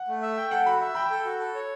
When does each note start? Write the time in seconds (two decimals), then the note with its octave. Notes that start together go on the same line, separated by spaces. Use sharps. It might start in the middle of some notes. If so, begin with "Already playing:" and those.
Already playing: F#5
0.08 A3
0.22 E5
0.37 G5
0.51 A4 F#5
0.66 F#4 B5
0.81 E5
0.95 G5 B5
1.10 A4
1.25 F#4
1.39 A4
1.55 C#5